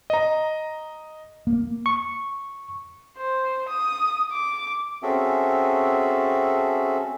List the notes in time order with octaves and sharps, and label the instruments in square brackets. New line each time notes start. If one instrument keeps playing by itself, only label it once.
[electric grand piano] D#5 A#5
[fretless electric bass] A#3
[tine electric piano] C#6
[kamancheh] C5
D#6
D6
[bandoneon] C4 C#4 F#4 G#4 A4 E5